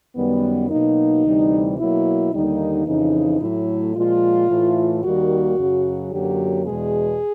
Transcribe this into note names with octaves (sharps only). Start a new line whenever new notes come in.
F#2 D#3 G3 B3
B2 F#3 A#3 D#4
D2 C3 E3 G3
B2 F#3 A#3 E4
D#2 D3 G3 A#3 D#4
F2 C#3 E3 D#4
A2 F#3 A3 E4
A#2 F3 G#3 F4
A2 E3 A3
D#2 D#3 G3 A#3 F#4
F#2 C#3 F#3
F#2 D3 F#3 A#3 G4
E2 B2 G#3 G#4